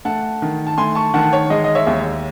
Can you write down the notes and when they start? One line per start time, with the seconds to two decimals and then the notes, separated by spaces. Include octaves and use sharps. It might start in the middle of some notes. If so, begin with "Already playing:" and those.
0.05 A3 F#5 A5
0.42 D#3
0.67 A5
0.78 A3 G#5 C6
0.95 A5 C#6
1.14 D#3 F#5 A5
1.33 C#5
1.50 G#3 D#5
1.64 D#5
1.75 C#5 E5
1.87 D#2